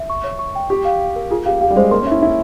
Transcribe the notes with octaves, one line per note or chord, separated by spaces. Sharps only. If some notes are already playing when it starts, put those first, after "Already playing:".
Already playing: E5
C#6
C#5
C#6
G5
G4 C#6
F5
F5
A#4
F4 G#4
G4 F5
G4 F5
G3
G#3 C5
A#3 C6
C#4
E4 E5
E4 E5